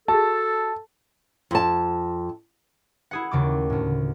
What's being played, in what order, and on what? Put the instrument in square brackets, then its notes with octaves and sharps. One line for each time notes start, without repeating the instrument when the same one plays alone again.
[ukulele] F#4 G#4 [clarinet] A4 [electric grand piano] A5
[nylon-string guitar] F2 A5
[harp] E4 G#4 F#5
D#2 C#3 A3 D6
D2 A2